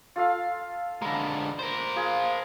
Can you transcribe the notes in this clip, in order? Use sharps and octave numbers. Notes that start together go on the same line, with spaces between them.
F4 A4 F5
D3 G#3 A#5 B5
A#4 C5
F4 G#4